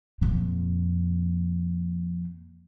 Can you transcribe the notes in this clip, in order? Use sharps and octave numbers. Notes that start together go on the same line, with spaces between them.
F2 A#2